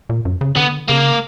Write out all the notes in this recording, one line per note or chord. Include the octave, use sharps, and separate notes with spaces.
A#2
F#2
C#3
D3 B3
C#3 A#3